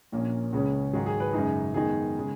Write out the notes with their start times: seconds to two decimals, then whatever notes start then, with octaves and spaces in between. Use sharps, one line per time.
0.12 A#1 A#2 A#3 C#4
0.53 C#2 C#3 G#3 C#4
0.93 G#2 D#3 F#3 G#4
1.06 G#4
1.20 B4
1.33 F#2 C#3 G#3 D#4 G#4
1.74 F#2 D#3 G#3 B3 D#4 G#4
2.18 C#3 G#3